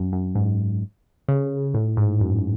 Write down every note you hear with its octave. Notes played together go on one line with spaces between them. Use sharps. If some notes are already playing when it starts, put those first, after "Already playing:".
Already playing: F#2
F#2
G#2
C#3
A2
G#2
F#2